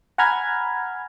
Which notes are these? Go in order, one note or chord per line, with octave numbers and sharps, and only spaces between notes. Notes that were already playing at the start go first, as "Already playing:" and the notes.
F#5 G#5 A#5 B5 F6 G#6